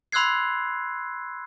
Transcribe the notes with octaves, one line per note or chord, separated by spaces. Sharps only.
B5 C6 E6 F#6 G#6 C7